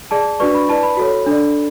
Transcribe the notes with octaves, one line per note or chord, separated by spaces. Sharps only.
G#4 D5 A5
D4 F#4 B4 D5 C#6
B5
E4 B4 D5 A5
B5
F#4 A4 C#5
D4 A4 D5